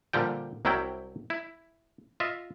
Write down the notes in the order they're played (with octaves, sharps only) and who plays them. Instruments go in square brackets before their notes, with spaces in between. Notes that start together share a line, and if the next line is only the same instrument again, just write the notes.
[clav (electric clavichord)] A#2 D3 F3 G3 G5
C2 C3 F#3 G3 E4 G5
E4
F4 D#5 E5